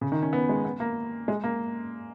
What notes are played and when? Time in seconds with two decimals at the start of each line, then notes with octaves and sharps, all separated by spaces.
0.01 C#3
0.12 D#3
0.22 C#4
0.33 B3
0.49 G#3
0.65 B3
0.80 A#3
1.28 G#3
1.44 A#3